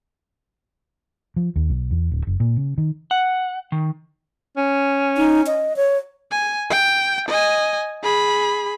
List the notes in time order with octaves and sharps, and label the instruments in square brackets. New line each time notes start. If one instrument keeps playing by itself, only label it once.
[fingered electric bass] F3
D#2
B1
E2
D1
F#1
A#2
C#3
D#3
[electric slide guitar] F#5
D#3
[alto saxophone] C#4
[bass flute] D#4
D#5
C#5
[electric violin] G#5
G5
D#5 G#5
G#4 B5